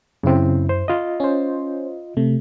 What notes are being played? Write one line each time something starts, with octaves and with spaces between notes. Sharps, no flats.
F#2 C#3 C4 E4
C5
F4 D#5
C#4 C5
C3 A3